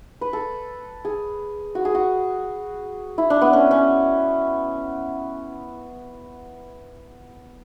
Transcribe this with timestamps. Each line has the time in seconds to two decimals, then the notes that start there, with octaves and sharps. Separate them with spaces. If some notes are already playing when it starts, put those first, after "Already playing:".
0.21 B4
0.33 A4
1.05 G#4
1.75 F#4
1.85 G#4
1.95 F#4
3.18 E4
3.30 D4
3.41 B3
3.53 C#4
3.71 C#4